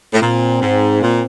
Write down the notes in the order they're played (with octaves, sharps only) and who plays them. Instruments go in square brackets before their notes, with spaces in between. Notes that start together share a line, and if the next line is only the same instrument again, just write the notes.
[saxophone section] A2
[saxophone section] A#2 [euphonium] C4
[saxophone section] G#2
A#2